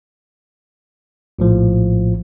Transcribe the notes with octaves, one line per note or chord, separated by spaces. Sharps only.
A#1 A2 F3